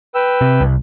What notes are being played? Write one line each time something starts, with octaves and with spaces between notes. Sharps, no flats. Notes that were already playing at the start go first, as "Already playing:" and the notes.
B4 G5 E6
C3
C2